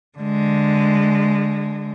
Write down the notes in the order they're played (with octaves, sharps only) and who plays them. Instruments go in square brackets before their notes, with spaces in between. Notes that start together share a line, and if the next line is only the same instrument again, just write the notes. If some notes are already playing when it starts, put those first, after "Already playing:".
[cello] D3 G#3